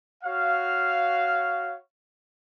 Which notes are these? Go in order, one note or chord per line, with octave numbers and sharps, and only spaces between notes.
F#4 C#5 F5